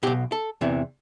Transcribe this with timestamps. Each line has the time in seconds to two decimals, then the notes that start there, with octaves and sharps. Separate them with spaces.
0.03 B1 B2 G4
0.32 A4
0.61 E2 C3 E3